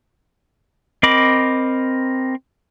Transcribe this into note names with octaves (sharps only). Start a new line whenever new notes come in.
C4 A#4 D#5 B5 D6